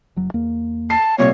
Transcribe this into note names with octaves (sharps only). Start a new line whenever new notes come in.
F#1 F#3
E2 A#3
A5 C7
C2 A#2 C#5